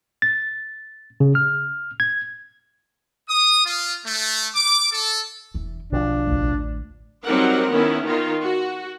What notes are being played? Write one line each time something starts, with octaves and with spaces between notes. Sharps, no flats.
A6
C#3
F6
G#6
D#6
F4
A3
D6
A4
E1 E3
B1 D3 F3 D4
A1 D2
F#3 G3 C4 D#4 A#4 F#5
D#3 B3 C#4 E4
D#3 D#4 F4
F#4